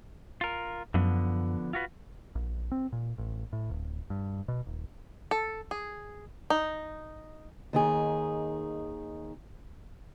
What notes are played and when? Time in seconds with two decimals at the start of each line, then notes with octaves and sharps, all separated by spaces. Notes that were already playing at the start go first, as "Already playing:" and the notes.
0.41 F4 A#4
0.94 F#2 D3 F3 B3
1.73 F4 F#4 B4
2.35 A#1
2.72 C4
2.92 A#2
3.18 A1
3.53 A2
3.70 D1
4.10 G2
4.48 B2
4.67 D#1
5.31 A4
5.71 G#4
6.50 D#4
7.73 D#2 D#3 G#4